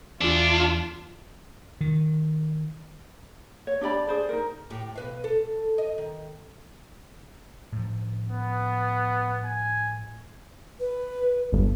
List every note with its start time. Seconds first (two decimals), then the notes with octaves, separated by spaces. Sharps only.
0.21 E2 A3 D4 F4 D5
1.81 D#3
3.67 C#5
3.81 D4 G4 D5 B5
4.07 G#4 C5 D5
4.29 D#4 A#4
4.70 A2 G4
4.96 B2 B4 F5
5.24 A4
5.78 D#5
5.98 D#3
7.72 A2 F3
8.27 B3
9.45 G#5
10.80 B4
11.52 G1